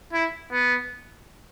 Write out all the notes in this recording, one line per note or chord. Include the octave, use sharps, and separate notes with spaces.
E4
B3